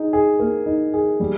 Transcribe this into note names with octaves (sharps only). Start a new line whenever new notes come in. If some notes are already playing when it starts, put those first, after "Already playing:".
Already playing: D#4 G#4
G#4
A#3
D#4
G#4
G3